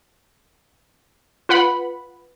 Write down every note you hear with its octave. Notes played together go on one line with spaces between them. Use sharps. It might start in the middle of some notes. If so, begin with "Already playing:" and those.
F4 B4 F#5 B5